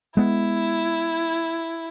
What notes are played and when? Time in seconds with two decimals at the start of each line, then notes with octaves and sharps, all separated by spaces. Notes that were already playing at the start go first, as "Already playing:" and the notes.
0.17 G#3 B3 E4